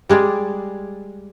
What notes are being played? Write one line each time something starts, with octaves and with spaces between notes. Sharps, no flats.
G3 G#3 G#4 D5